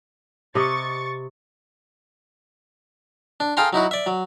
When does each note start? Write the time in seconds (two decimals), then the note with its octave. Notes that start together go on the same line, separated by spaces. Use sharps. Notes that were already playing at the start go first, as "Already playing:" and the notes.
0.55 C3 D#5 C#6 A6
3.40 D4
3.57 G#4 A4 F5 G5 A#5 C6
3.73 F#3 D#4 E4 F#4
3.91 D5 E5
4.06 F#3